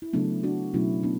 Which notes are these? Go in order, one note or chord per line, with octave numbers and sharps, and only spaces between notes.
E4
C#3 F#3 A3 B3 D4
D4 F#4
B2 F#3 A3 C#4 E4
B3 D4